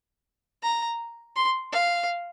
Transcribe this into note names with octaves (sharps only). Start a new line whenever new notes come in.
A#5
C6
F5